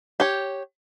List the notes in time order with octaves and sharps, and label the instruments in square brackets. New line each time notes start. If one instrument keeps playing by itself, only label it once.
[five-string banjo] G4 C#5